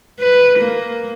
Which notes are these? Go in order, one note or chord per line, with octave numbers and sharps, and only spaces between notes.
B4
A#3